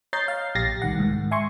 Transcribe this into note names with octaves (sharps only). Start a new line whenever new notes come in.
C#5 D#5 A#5 G6 A6 C7
F5
A#1 G4 A6 A#6 C7
C2 D#3 F#5
G#2 D#3
E5 G#5 C6 C#6